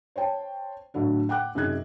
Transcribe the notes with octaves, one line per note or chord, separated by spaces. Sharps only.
C5 C#5 G5 A5
A2 D3 F#3 D4
F#5 G5 D6 F#6
F#2 C3 D#4 G#4 F#6 G#6